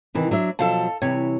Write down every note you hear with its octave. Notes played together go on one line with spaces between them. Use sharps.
C3 D#3 E3
F#3 D4 E5
B2 F3 F#3 A4 F5 A5
C3 E3 G3 C#5